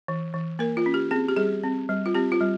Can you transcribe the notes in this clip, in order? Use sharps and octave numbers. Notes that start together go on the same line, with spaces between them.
E3
E3
A#3 A#4
F4
C#4
G4
C4 G#4
G4
G3 G#4
C4
G3
F4
C4 G4
F4
G3